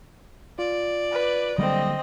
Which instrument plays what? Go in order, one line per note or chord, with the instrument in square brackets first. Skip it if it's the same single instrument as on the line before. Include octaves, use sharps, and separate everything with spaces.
[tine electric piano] F4 [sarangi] D5
[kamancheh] B4
[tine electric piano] D3 [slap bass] F#3 G3 A#3 [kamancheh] C4 D#5